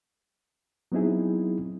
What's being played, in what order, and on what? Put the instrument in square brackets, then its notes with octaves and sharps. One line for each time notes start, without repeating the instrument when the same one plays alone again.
[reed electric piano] F#3 B3 C4 D#4 E4 G#4